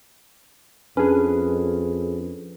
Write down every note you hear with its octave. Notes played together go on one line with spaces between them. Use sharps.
F2 C#4 D4 G#4 B4